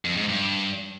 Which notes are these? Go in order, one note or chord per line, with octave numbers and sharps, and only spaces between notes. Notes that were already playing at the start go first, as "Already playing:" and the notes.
F2
G#2
G2